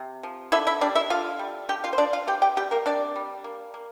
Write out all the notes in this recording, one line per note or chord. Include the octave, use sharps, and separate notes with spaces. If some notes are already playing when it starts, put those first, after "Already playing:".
Already playing: C3
F3
D3 E4 E5
E4 E5
G3 D4 D5
E4 E5
D3 F4 F5
G3
D3 G4 G5
F4 F5
C5
F3 D4 D5
F4 F5
E3 G4 G5
G4 G5
G3 G4 G5
A#3 A#4
C3 D4 D5
G3
A#3
A#3